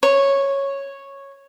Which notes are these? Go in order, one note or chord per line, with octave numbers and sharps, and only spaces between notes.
C#5